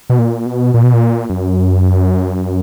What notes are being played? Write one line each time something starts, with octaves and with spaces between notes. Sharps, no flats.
B2
A#2
B2
A#2
B2
A#2
F#2